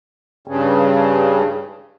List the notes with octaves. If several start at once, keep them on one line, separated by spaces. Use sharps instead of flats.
G2 C#3